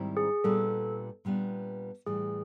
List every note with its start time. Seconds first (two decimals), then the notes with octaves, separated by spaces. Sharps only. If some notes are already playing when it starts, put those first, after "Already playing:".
Already playing: G#2 D#3 G3 C4 E4
0.17 G#4
0.44 A#2 G3 B3 D4 A4
1.25 A#2 G3 B3 D4
2.06 A2 E3 G3 G#4